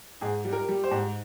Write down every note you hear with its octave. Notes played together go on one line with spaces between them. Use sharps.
G#2 G#4
G3
A#4
G3
C5
G#2